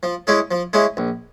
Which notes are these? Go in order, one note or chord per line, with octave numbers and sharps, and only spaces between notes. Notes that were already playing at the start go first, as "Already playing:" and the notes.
F3
G#3 C#4 E4 G#4
F3
G#3 C#4 E4 G#4
A#1